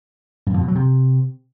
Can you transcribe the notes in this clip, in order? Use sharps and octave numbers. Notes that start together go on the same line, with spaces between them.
G2
F2
B2
F#3
C3